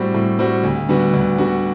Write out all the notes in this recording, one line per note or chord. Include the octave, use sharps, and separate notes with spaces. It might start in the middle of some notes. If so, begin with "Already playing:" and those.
Already playing: A2 G3 C4 F#4
A2
G3 C4 F#4
D2
D3 G3 B3 F#4
D2
D3 G3 B3 F#4